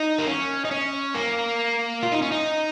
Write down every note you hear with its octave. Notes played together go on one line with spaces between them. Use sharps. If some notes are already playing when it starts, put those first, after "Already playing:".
Already playing: D#4
A#3
C#4
D#4
C#4
A#3
F4
D#4
C#4
D#4